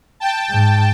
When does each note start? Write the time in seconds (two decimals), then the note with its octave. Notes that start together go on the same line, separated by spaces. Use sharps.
0.20 G5 A5
0.50 G#2